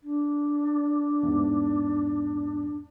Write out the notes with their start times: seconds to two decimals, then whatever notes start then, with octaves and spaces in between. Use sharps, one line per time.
0.02 D4
1.23 E2 G#2